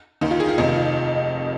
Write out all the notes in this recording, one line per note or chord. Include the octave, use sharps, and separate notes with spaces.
D#2 D#3 D#4
F4
G#4
F4
F1 F2 C3 D#3 D#4
F4